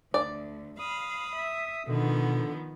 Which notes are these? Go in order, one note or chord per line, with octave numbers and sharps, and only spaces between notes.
D2 D5
F5 B5 D#6
E5
B2 D3 D#3 F3 B3